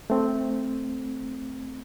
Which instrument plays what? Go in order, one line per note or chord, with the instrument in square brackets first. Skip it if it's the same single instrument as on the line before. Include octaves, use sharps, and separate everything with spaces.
[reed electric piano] A3 C4